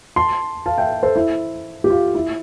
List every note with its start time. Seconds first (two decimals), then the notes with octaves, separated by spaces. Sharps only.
0.16 A5 C6
0.66 F5 A5
0.78 E5 G5
1.03 A4 C5
1.16 E4
1.84 G4
1.90 F4
2.15 E4